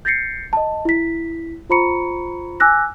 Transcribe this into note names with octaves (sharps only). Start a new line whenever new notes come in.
G6 A6 A#6 C7 C#7
D#5 A5
E4 B6
F4 C5 A#5 B5 C#6 C#7
G#5 D6 E6 F#6 A#6